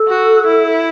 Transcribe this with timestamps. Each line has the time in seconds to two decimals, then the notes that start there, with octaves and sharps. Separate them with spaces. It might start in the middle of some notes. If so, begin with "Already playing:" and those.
Already playing: A4
0.08 F#4
0.46 E4